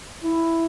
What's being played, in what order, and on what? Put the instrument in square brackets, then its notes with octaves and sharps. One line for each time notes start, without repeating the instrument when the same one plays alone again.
[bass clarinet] E4